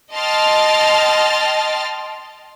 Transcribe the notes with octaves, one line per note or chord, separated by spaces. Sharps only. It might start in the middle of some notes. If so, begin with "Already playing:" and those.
D#5 G5 A5 C6 F6 A6